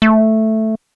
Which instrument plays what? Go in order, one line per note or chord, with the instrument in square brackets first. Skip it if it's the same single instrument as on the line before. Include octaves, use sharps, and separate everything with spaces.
[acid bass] A3